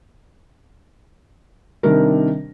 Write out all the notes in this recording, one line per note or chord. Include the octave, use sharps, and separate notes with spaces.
C3 D#3 G3 D4 A#4